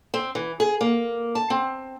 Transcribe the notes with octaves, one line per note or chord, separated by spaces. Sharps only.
C4
E3
G#4
A#3
A5
C4